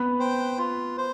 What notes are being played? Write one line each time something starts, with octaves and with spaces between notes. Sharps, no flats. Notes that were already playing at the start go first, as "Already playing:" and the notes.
Already playing: B3 B4
C5 G5
F4
C5